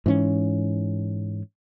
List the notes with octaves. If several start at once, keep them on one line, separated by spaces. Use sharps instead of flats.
G#2 E3 C4 C#4